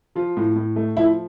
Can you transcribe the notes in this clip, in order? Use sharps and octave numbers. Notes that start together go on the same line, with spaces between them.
F3 F4
A2
A2
A3
F3 E4